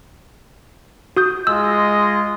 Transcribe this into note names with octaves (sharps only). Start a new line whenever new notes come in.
F#4 D#6 G6
G#3 F4 D#5 E6